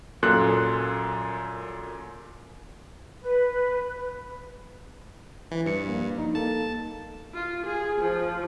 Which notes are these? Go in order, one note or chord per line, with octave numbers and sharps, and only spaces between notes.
F#2 A#2 A4 C6 F#6
B4
E3
G2 B4 C#7
F3 A#3
D#4
A#3 A4 A5
F4
G#4
F3